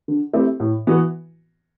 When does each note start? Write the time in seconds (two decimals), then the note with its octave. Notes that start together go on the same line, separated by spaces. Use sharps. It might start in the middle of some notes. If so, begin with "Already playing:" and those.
0.08 D3
0.33 A3 C4 E4 G4
0.60 A2
0.87 E3 B3 F#4